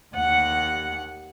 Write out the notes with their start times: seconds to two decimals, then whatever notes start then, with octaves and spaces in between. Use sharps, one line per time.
0.16 D#2 F#5